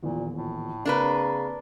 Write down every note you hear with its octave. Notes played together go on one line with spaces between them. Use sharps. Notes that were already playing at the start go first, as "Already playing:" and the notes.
D#1 A#1 E2 A#2
A2
C#3 A#3 C4 D4 G#4 A#4 B4